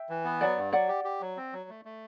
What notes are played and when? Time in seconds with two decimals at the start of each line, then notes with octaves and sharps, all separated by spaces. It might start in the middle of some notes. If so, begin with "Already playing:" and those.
Already playing: E5 G5
0.09 E3
0.24 B3
0.41 F#3 D5 F#5
0.57 G2
0.73 F#3 D5 F#5
0.89 G4
1.05 G4
1.21 F#3
1.37 C4
1.53 F#3
1.69 A3
1.85 A3